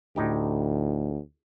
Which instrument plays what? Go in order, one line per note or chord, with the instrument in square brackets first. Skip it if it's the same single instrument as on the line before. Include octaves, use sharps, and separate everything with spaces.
[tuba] D2 [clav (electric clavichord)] A2 D#4 G4